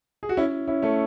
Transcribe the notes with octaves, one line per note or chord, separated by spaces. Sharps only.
G#4
F#4
C#4 E4
C#4 E4
A3 C#4